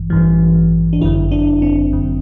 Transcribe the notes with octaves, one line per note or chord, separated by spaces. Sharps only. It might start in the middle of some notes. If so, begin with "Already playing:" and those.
Already playing: A1 G2 E3
A1 G2 E3
D4
G1 F#2 D3 E4
D4
C4
G1 F#2 D3